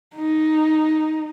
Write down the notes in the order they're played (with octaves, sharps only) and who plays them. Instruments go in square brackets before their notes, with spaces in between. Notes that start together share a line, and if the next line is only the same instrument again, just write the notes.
[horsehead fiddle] D#4